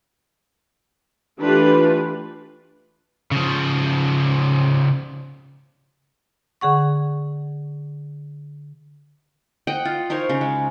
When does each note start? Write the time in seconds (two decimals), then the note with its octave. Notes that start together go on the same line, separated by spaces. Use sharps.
1.39 E3 A3 D4 F4 G4 B4
3.31 C#3 F3
6.61 D3 G#4 F#5 C#6
9.67 D#5 F#5 G5
9.85 F4
10.10 D#4 A#4 C5 C#5
10.29 C#3
10.41 G#3